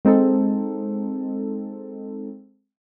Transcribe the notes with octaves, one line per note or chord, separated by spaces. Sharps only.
G#3 C4 D#4 A4